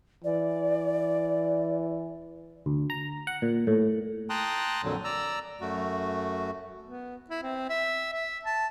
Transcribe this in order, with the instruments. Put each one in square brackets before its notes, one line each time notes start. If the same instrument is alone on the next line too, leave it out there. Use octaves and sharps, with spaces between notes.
[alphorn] E3 [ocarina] D5
[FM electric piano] D2
A#5
F#5
A#2
A2
[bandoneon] G5 A5 A#5 C6 D#6 F#6
F2 A#2 D3 F#3
D5 A#5 E6
F#2 A3 F#4
[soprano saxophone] B3
E4
C4
E5
E5
A5